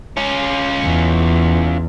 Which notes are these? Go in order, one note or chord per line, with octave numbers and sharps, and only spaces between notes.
C#4 F4
E2